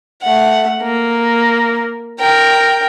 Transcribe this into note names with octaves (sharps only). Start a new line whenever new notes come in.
A3 F#5
A#3
A#4 G5